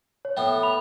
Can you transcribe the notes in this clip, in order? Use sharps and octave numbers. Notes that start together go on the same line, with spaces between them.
C#5
A2 B3 G5
B5 F7